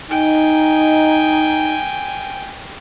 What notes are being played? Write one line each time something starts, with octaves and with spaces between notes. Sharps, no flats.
D#4 G5 G#5